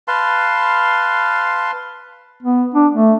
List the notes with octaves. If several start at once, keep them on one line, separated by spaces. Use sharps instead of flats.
B4 F5 A5 C6
B3
D4
A3